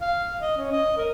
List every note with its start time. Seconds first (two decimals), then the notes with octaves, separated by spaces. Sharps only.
0.01 F5
0.41 D#5
0.57 C#4
0.72 D#5
0.97 A#4